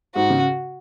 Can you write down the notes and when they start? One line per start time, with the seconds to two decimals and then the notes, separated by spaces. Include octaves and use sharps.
0.15 G#2 F#4
0.30 C#3